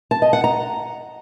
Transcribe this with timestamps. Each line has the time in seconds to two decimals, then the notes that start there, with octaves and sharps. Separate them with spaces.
0.11 A5
0.22 D#5
0.33 F#5
0.44 A#5